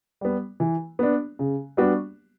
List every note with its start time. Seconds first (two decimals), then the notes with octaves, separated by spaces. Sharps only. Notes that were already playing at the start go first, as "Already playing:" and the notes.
0.21 G3 B3
0.60 E3
0.99 B3 D4
1.39 C#3
1.77 G3 B3 D4 F#4